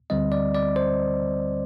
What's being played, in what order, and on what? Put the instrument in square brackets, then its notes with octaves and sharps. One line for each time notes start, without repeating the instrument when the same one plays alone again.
[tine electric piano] D2 D3 G3 C4 D#5
D5
D5
C5